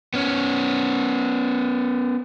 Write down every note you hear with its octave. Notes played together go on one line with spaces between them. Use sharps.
B3 C#4